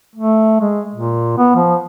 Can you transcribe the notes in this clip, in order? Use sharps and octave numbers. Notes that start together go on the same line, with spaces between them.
A3
G#3
A#2
B3
F3